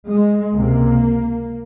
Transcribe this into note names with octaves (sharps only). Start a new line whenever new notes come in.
G#3
C#2 C3 A#3